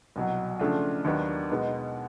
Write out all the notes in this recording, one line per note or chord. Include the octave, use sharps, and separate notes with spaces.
C2 B2 F#3
C#3 F3 A3 D4 F4
D#2 D#3 F#3 B3 D4
B2 G#3 B3 D#4